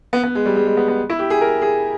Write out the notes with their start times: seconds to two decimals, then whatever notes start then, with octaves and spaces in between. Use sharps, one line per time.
0.13 B3
0.23 B3
0.35 G#3
0.46 G3
0.56 G#3
0.67 G#3
0.77 B3
0.88 B3
1.10 E4
1.19 G4
1.30 G#4
1.41 A#4
1.62 G#4